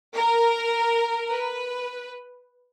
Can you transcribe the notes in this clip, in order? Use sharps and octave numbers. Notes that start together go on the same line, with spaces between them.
A#4
B4